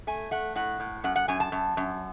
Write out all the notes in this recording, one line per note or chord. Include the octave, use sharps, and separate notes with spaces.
A3 G#5
A3 F#5
A2 F#5
A2
F#2 F#5
F#5
F#2 G#5
A5
F#2
F#2